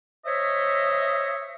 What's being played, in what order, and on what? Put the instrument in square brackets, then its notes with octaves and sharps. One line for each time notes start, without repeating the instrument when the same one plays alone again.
[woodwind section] C5 C#5 D#5 E5